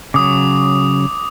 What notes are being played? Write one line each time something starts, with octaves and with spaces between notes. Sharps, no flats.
C#3 F#3 D6 D#6